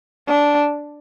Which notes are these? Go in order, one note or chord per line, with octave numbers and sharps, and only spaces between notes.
D4